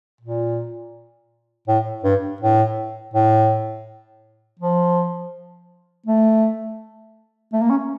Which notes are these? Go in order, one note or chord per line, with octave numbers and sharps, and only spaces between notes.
A#2
A2
G2
A2
A2
F3
A3
A3
A#3
C#4